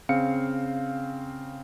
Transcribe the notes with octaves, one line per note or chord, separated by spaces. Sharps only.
C#3 C4 F5 C#7